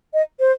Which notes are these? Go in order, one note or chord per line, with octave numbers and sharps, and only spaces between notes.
D#5
C5